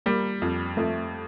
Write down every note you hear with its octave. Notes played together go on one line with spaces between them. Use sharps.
G3 A#3
F2
F2 A3